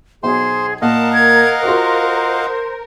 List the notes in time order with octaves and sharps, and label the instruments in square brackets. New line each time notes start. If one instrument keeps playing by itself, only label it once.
[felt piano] B1 [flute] G#4 [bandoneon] C5 C6
[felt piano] A#2 [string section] A#4 [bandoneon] D#5 F5 F#5 [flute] A5
[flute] G#6
[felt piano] F4 F#4 [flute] C5